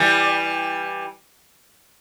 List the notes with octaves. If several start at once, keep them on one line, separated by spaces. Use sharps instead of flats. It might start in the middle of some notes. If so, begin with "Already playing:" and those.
Already playing: E3 G3